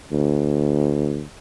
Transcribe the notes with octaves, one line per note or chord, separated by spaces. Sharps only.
D2